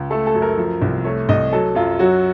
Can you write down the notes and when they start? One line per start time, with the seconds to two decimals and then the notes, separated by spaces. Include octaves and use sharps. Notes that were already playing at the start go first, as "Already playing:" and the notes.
Already playing: C#2
0.10 A3 A4
0.27 A4
0.35 F#2
0.42 A#4
0.58 F3
0.82 C2
1.05 A3 C#5
1.29 C2 D#5
1.52 F#3 A4
1.75 F#2 F4
1.99 F#3 F#4